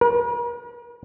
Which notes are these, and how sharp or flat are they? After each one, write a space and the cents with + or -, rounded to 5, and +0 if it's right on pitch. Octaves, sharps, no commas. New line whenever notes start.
A#4 +45